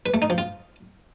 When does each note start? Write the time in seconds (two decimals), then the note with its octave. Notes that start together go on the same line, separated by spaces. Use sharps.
0.06 B4
0.14 A3
0.22 D#4
0.30 F3
0.38 F4